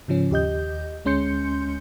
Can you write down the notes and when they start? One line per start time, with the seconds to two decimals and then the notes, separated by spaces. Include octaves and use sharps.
0.08 G#2 C#3 F3 C#4
0.31 D#2 G4 D#5 G6
1.05 D2 G#3 C#4 C6 G6 C#7